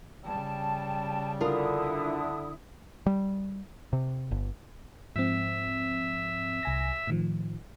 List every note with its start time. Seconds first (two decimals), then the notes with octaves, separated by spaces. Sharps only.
0.24 C#3 G3 G5 A5
1.41 D3 D4 E4 F4 A#4 D#6
3.06 G3
3.93 C3
4.31 G1
5.16 G#2 F3 C4 E5
6.63 C2 G#5 A#6
7.07 A2 D#3 F3